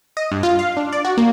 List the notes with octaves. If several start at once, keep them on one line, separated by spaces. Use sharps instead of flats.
D#5
G2
F4
F5
D4
D5
F#4
A#3